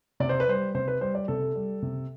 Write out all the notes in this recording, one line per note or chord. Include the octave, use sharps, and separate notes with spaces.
C3 D5
C5
B4
G3 C5
C3 C5
B4
G3 C5
D5
C3 A4
G3
C3